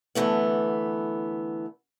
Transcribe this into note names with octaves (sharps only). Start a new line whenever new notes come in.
D3 E3 A3 B3